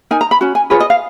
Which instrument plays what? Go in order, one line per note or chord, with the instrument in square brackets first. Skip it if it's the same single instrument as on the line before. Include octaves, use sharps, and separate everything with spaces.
[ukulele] D#4 A#4 G#5
A#5
B5
C#4 F#4
G#5
F4 G#4 B4 C#5
D#5
F5